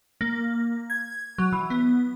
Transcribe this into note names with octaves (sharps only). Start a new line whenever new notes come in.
A#3
G#6
F#3
E3
B3